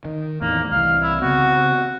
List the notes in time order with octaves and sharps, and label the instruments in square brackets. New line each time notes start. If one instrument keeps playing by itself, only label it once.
[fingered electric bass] D#3
[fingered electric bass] E2 A2 D#3 [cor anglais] A#3
[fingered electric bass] C2 E3 [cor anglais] F5
[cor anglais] E4
[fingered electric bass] C#3 B3 C4 [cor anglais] F#4